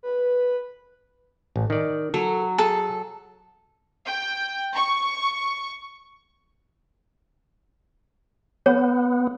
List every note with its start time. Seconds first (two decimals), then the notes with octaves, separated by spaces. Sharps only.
0.03 B4
1.56 A1
1.70 D#3 D5
2.14 F#3 A4
2.58 G#4 A4
4.06 G5
4.75 C#6
8.66 B3 C#5